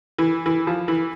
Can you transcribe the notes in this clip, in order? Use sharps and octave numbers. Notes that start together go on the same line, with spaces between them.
E3
E3
F3
E3